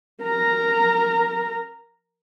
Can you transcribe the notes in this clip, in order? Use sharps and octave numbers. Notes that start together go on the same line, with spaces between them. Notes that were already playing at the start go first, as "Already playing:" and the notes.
A#4 A#5